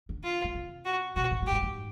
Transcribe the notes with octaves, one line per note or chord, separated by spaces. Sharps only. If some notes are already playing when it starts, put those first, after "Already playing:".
D3
F4
C#3
C3
F#4
B2 F#4
A2
G#2
G4
G2
G#2